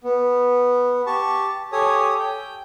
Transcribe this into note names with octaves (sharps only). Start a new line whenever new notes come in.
B3
G4 A5 C#6
G4 A4 C#5 G#5 D#6
G5